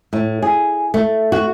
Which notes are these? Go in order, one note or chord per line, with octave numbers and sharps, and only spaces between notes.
A2
G#4
A3
F#4